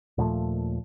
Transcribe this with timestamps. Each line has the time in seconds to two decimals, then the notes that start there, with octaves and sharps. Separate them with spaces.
0.18 D#2 A#2 F3 A3